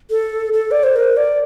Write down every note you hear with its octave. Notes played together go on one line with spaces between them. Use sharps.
A4
A4
D5
C5
A#4
D5